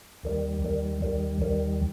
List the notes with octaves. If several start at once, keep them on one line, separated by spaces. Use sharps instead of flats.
D#2 D#3 G3
D#2 D#3 G3
D#2 D#3 G3
D#2 D#3 G3